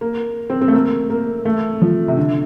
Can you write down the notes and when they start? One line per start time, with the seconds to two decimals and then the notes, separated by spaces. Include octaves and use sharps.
0.01 A#3
0.50 C4
0.61 C4
0.68 A3
0.73 A#3
1.10 A#3
1.45 A3
1.82 F3
2.08 C3
2.17 D3